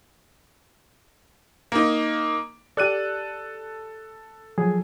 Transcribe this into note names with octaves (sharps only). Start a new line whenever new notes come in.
A#3 D#4
G4 A4 D5 F#6 D#7
F3 F#3 G#4